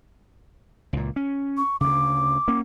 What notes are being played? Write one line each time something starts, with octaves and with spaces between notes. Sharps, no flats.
C#2 A#2
C#4
C#6
D2 C#3 D6
A#3 C#4